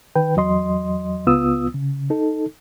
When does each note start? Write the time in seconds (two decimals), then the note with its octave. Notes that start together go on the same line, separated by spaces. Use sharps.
0.16 D#3 B4 G5
0.36 E2 F#3 D#5 C6
1.27 C#2 B3 F4 D#6 E6
1.74 C#3
2.10 D#4 A4